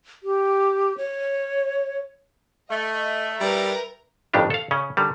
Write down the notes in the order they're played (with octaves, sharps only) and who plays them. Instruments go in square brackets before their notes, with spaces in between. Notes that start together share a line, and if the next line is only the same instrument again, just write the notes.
[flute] G4
C#5
[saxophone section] A3 [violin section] D#5 [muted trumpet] E5
[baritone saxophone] G3 [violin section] A#4 B4 A#5
[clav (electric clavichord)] G1 F2 A2 D#3 D4 G4
A4 F5
C#3 C#4
D3 D#3 G3